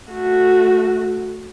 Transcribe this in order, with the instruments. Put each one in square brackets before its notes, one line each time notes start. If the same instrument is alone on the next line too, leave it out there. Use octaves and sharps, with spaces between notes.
[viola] A3 F#4